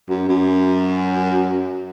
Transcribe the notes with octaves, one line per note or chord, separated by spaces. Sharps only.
F#2
F#2